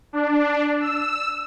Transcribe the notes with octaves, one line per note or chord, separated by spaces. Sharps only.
D4
E6